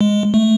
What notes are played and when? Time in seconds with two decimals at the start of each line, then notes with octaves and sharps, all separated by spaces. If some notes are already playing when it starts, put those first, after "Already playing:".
0.01 G#3
0.34 A3